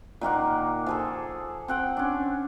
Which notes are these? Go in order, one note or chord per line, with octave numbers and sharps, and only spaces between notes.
A#2 D#3 A#3 F#5
F3 G#4 A4
C4 F#5 G5
C#4 D4